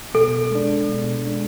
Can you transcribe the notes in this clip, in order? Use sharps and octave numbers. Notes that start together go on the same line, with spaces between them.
B2 A4
G#3 D4
B2
G#3 D4